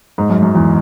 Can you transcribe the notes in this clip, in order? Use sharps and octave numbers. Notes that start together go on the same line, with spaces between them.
G#2
F#2
F#2
E2